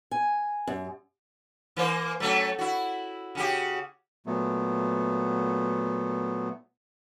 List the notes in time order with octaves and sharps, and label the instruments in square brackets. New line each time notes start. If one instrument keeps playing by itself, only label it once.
[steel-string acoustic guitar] G#5
F#2
[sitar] E3 A#3 C5
F#3 A3 C#4
E4 F#4
C#3 F#4 G4
[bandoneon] A#2 F#3 A3 B3